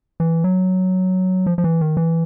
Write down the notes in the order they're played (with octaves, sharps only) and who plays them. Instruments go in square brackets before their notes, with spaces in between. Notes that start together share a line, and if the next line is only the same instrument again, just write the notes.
[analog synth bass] E3
F#3
F3
F3
E3
D#3
E3